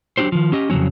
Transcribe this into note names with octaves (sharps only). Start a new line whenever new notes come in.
F#3 D4 E4 G4 C5
D#3 F3
C#4 G4 D#5
F2 C#3 E3 F#3 C#4